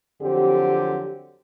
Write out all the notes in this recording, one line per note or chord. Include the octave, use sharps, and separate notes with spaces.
F2 D3 F#3 C4 G4